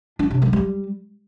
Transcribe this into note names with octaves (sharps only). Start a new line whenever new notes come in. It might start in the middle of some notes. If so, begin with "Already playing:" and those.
D4
C3
G3
G3